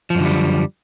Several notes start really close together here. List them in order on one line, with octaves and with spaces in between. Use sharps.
F3 F#2 D3 G3